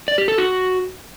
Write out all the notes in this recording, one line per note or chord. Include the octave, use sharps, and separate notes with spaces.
D5
G4
A4
F#4